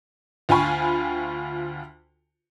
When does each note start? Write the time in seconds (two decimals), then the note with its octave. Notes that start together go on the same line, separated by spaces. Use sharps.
0.49 D2 F4 G5 G#5 B5 C#6